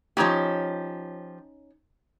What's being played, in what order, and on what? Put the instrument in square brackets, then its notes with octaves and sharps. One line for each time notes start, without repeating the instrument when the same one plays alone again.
[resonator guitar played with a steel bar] F3 G4 [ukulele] C#4 D#4 C#5